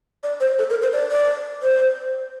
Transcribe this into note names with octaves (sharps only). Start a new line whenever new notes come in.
D5
C5
A4
A#4
C5
D5
D5
C5